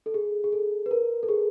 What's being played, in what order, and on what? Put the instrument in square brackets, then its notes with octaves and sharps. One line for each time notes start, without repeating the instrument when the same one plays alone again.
[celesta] A4
G#4
G#4
A4
B4
A#4
A4
G#4